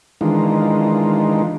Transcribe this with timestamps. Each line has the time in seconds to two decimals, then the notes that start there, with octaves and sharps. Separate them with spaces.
0.21 D#3 E3 G#3 D4 D#4 F4